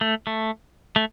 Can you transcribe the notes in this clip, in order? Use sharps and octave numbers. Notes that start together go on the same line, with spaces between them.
A3
A3
A3